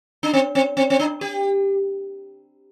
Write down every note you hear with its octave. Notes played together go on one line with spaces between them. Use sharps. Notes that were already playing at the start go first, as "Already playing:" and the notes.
D4
C4
C4
C4
C4
D4
G4